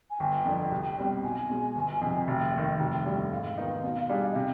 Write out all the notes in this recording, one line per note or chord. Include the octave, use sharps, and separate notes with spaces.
G#5
G1 G5
F2 D3
C2
B2 G3 C4
B1 G#5
B2 G#3
G1
F2 C3
F1 G5
D#2 D#3
F1
D#2 D3 G3
G#2 F5
D#3 B3 D#4
B2
G3 D4 G#4
D#5
C3 F5